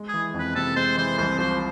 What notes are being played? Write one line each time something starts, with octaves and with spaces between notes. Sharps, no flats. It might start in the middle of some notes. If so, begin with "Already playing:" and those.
Already playing: G#3
G#4
E3
F2
B4
C3 A4
G#3 C5
E3 C5
C2 C5
F3 C5